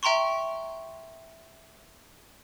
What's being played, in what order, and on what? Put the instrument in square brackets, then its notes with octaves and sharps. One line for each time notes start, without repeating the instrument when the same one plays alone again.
[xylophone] E5 G5 A#5 C6 C#6